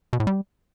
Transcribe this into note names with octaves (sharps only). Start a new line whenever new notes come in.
B2
A2
G3